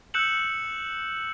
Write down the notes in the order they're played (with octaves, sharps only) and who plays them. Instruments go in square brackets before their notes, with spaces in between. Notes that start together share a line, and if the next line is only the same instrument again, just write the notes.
[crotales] E6 F#6 G6 C#7 E7 F#7